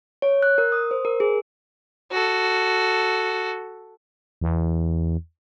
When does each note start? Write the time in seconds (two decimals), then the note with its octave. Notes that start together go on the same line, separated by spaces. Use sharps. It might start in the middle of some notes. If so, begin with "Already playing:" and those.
0.22 C#5
0.43 F#6
0.58 A#4
0.72 D#6
0.91 C5
1.05 A#4
1.20 G#4
2.12 F#4 A4
4.41 E2